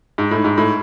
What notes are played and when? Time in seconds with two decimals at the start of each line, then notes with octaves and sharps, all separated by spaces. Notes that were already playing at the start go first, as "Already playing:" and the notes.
0.18 G#2
0.31 A2
0.44 G#2
0.58 A2